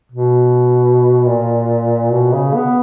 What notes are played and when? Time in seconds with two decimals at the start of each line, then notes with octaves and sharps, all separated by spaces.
0.12 B2
1.26 A#2
2.12 B2
2.33 C#3
2.55 B3